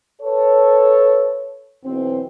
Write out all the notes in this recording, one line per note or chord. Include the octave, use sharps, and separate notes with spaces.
A4 B4 C#5
B1 E3 C4